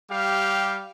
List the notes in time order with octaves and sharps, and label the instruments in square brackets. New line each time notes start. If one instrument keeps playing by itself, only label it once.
[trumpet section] G3 G4 F5